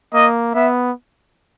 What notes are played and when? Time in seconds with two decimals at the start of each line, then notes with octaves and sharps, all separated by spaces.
0.14 A#3 D#5
0.55 B3 E5